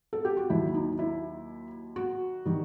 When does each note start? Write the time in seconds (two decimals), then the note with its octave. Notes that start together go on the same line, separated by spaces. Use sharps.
0.13 A4
0.25 G4
0.37 F#4
0.50 D#2 D#3 F#3 E4
0.74 D#4
0.99 E4
1.96 F#4
2.45 D#3 G3